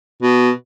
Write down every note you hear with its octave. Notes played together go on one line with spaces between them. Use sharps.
B2